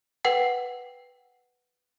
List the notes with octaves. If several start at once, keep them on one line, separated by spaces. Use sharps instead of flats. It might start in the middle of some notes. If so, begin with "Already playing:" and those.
B4 F#5 G5